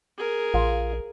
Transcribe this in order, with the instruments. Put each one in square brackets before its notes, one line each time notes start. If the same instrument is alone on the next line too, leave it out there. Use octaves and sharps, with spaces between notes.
[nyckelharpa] G#4 A#4
[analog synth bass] A#1 [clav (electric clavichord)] F4